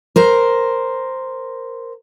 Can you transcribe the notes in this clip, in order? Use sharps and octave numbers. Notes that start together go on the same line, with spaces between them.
A#4 C5